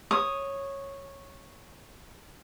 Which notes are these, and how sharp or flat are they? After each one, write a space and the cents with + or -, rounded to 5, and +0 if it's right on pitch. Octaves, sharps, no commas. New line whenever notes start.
C#5 -10 D#6 +0